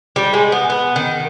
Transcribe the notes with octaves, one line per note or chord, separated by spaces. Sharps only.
G3
G#3
B3
B3
D#3